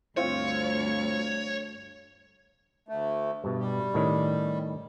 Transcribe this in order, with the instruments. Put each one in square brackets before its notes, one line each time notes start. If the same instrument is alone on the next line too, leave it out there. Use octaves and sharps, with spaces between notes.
[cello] D2 G2 [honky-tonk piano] C4 F4 [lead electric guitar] C#5
[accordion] D2 A3
[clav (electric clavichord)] G2 B2
[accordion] G3
[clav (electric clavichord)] A2 D#3 C#4